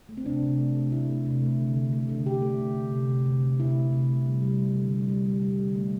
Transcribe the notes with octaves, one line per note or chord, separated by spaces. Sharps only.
A3
C4
C3 D4
C3
A3
A3
A3 E4
A3
C3
A3
D3
D3
A3
D3
D3 G4
A3
D3
D3
C3
C3
C3
C3
C3 E4
A3
C3
A3
G3
G3
G3
D3
G3
G3
G3
G3
D3
A3